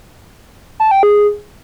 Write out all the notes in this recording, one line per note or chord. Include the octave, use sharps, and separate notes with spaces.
A5
G5
G#4